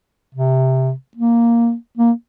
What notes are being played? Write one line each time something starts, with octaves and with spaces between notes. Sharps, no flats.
C3
A#3
A#3